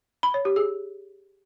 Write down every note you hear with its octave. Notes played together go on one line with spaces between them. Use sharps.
B5
C#5
G4
G#4